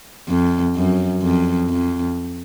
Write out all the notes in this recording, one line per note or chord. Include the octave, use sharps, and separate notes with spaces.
F2
F#2
F2
F2